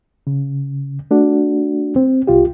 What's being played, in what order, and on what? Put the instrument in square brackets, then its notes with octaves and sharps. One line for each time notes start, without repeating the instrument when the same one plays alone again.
[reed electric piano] C#3
A3 D4 F#4
C4
C2 F4 G4